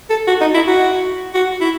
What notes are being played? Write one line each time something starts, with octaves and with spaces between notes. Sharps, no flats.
A4
F#4
D#4
E4
F#4
F#4
E4